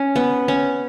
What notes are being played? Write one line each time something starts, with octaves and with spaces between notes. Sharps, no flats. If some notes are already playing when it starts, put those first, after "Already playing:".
Already playing: C#4
B3
C#4